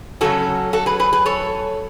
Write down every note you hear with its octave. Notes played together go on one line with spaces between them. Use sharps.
C#3 F#3 C#4 F#4 A4
F#4 A4
G#4 B4
G#4 B4
G#4 B4
A4 C#5